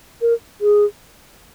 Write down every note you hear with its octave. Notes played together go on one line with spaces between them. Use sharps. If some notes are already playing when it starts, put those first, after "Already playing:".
A#4
G#4